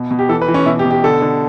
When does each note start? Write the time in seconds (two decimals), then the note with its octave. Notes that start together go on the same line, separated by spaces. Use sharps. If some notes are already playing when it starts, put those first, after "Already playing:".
Already playing: B2
0.11 B2
0.19 G4
0.29 E3 A4
0.42 B4
0.48 E3
0.54 C#4
0.66 B2 E4
0.79 G4
0.85 B2
0.91 G4
1.04 D3 A4
1.22 D3